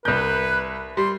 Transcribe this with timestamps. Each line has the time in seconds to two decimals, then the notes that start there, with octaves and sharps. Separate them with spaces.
0.05 C2 B4 G6
0.97 G3 C6